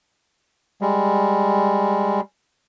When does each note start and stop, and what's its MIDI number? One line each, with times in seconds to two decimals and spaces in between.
0.81 2.21 55
0.81 2.21 56